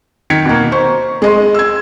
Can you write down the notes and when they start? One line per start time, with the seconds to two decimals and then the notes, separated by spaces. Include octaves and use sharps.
0.30 D#3 G#6 B6 C#7
0.46 B2 A#3
0.72 C5 C#6
1.22 G#3 D#5 C6
1.54 E6 G#6